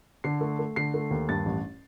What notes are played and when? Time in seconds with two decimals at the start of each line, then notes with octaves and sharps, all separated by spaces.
0.24 D3 C7
0.41 A3
0.59 A3
0.76 D3 C7
0.94 A3
1.11 D#2
1.29 G2 A6
1.46 A1